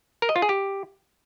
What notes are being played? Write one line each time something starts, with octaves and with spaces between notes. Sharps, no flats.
A#4
D#5
F4
G#4
G4